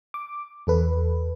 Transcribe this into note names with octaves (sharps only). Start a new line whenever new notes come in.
D6
E2 A4 B4